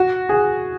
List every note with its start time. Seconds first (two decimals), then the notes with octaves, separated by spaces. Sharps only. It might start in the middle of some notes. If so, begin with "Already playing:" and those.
Already playing: F#4
0.29 G#4